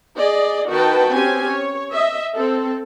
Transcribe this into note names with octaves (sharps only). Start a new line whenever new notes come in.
G#4 D5 D#5
D#3 D#4 F#4 B4 G5 A5
C4 C#4 G4 G#5
C#5
D#5 E5
C4 A4